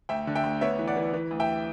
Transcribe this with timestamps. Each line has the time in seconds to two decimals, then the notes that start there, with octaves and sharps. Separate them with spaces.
0.09 D2 E5 G5
0.27 D3
0.35 E5 G5
0.44 D2
0.61 B3 C#5 E5
0.79 E3
0.87 D5 F#5
0.97 E3
1.14 E3
1.31 D2
1.40 E5 G5